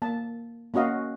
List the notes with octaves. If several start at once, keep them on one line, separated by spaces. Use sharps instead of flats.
A#3 A5
A#3 C#4 F#4 D#5 F5